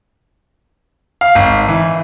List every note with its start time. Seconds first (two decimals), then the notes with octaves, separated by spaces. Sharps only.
1.21 F5
1.35 G#1
1.69 E3